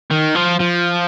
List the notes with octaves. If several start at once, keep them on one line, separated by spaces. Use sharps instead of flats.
D#3
F3
F3